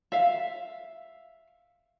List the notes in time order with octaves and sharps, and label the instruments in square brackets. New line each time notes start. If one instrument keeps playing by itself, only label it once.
[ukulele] E5 F5